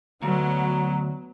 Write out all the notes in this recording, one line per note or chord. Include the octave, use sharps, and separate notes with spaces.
D2 F#3 B3 A#5